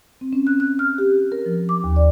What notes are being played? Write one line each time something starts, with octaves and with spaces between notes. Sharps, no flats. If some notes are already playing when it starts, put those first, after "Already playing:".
C4
C#4
F#6
F#6
F6
G4
A#4
F3
D6
D#2
D5